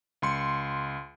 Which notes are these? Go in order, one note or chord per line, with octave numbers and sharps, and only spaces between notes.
C#2 C6 C#7